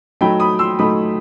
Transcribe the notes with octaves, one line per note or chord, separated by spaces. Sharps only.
F#3 A3 D#4 G5 B5
B5 D#6
C6 E6
F#3 A3 D#4 B5 D#6